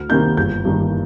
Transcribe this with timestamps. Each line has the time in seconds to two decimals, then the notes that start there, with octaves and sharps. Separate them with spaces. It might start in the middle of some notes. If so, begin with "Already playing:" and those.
Already playing: D2 F6
0.09 C3 D#3 A#3 D#4 G6
0.37 G1 G6
0.65 G2 D#3 A#3